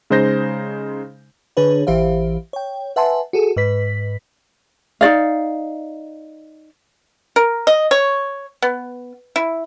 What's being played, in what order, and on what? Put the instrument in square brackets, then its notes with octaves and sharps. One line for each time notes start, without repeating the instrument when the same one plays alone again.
[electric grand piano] C#3 G#3 D#4 C5 G6 A#6
[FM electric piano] D3 D4 G#4 B4 C#5
A1 E3 G4 C5 E5 F5
C#5 G5
B4 E5 F#5 G#5 A5 C6
F#4 G#4 A4
G#2 B4 B6
[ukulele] D#4 F#4 D5 F5
[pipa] A#4
D#5
C#5
B3
E4